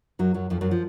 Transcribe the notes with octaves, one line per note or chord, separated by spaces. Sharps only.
F#2 F#3
F#2 F#3
F2 F3
F#2 F#3
F3